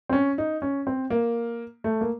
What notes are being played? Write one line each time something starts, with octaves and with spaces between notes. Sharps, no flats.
C4
C#4
D#4
C#4
C4
A#3
A3
A#3